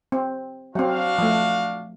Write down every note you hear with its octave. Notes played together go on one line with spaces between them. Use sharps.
C4
F#3 C4 D4 F#4 F5
F3 A3